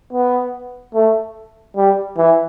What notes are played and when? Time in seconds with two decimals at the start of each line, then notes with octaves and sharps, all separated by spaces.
0.13 B3
0.94 A3
1.77 G3
2.17 E3